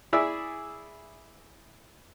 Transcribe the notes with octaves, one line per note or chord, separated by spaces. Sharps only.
E4 G#4 D5 E5 E6